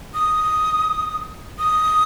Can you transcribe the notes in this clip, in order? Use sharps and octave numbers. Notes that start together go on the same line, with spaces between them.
D#6
D#6